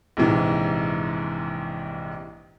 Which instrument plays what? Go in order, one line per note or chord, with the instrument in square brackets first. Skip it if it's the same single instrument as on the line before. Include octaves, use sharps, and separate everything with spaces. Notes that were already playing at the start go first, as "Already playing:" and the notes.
[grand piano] A#1 G#2 C3 E3